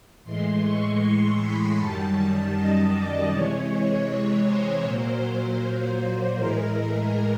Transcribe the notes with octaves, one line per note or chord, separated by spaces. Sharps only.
A2 E3 G#3 C6
C#6
C6
B5
F#2 D#3 G3 A5
D#5
D5
C3 E3 G#3 C#5
C#5
C5
A#2 F#3 A#3
A2 E3 G#3 A#4